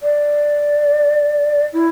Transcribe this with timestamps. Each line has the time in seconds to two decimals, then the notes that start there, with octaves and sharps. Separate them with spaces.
0.01 D5
1.73 E4